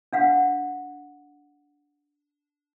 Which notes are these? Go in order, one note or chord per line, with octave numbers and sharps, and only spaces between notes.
D4 F5 F#5